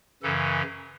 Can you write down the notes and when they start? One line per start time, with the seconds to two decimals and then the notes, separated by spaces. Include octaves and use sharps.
0.23 F#2 C#3 E3 A4